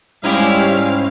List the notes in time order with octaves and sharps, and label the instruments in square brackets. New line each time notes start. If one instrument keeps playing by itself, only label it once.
[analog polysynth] G#2 C#4 C5 [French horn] G3 [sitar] D#4 E4 G4 [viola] F5